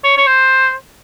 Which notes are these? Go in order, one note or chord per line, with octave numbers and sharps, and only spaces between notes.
C#5
C#5
C5